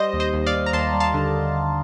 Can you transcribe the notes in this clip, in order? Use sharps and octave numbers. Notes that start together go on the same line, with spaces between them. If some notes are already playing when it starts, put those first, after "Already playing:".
Already playing: G3 C5 D#5
D#2
C5 D#5
D#2
D5 F5
D#2
A#5
D#2 A5 C6
G3
F5 A5
D3